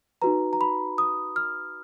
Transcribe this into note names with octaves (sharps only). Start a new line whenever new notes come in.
D#4 F#4 B4 A#5
A#5
B5
D#6
F6